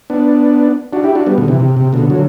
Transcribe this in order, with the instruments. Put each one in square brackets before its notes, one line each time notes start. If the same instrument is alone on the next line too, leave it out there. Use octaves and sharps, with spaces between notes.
[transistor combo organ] B3 D4
D4 F#4
E4 G4
D4 F#4
G3 B3
B2 D3
C3 E3
C3
C3
B2 D3
D3 F#3